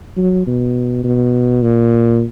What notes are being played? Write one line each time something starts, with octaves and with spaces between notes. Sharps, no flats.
F#3
B2
B2
A#2